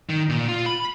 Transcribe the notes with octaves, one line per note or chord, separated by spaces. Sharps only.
D#3
A#2
F4
B5